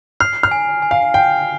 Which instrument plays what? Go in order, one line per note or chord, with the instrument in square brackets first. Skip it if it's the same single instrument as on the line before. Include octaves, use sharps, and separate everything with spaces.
[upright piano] F6 [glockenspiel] C7
[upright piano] F6
[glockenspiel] G#5
G#5
[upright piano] F5
[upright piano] G5 [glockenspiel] C7